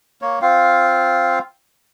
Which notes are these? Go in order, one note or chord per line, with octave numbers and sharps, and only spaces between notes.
A#3 C#5
C4 F4 F5